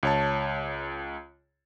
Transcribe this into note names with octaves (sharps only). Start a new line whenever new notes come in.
C#2 C#5 A5